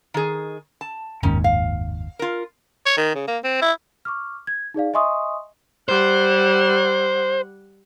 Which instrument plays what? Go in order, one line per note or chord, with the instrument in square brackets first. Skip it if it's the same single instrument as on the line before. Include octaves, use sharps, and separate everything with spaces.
[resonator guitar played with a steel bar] D#3 G#4
A5
[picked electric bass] F#1 D#2 G#2 [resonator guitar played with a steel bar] D#3 C#4
[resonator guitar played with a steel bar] F5
F4 A#4
[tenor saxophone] C#5
D#3
C#3
A#3
C4
E4
[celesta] C#6 D6 F6
G#6
D#4 G#4 D5 F5
D#5 E5 G#5 C6 C#6 D#6
[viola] G3 F#5 [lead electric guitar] C5